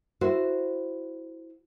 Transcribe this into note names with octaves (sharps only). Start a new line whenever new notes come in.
E4 F#4 C5